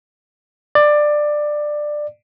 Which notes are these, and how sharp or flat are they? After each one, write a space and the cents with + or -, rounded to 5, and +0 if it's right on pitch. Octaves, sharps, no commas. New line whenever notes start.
D5 +15